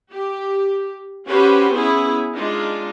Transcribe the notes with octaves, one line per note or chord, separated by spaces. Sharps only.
G4
C#4 F#4 G4 B4 C5
B3 C#4 E4 G#4
G#3 D4 D#4 F4